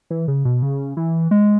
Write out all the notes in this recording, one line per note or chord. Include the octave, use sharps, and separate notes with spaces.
E3
C#3
B2
C#3
E3
G#3